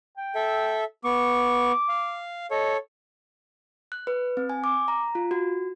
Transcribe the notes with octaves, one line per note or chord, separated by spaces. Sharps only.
G5
A4 E5
B3 C#6 D6
F5
A4 C#5 D#5
F#6
B4
C4
G#5
D6
A#5
F4
F#4